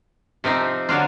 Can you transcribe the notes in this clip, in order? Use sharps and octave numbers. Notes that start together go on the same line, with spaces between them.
C3 F3 C4 D#4
D3 F#3 D4 F4